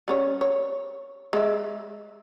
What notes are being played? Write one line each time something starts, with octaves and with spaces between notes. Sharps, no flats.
G3 C#4 C#5
C#5
G#3 E5